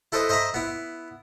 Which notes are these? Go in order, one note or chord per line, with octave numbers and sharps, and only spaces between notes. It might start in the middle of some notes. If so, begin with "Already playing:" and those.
E4 A4 B4 C5 D#5
C5 D#5 E5 A#5 B5
B3 E4